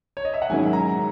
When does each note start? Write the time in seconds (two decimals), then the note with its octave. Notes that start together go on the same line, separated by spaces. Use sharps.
0.17 C#5
0.25 D#5
0.34 E5
0.42 F#5
0.49 G#2 D#3 F#3 C#4 E4 G#5
0.73 A#5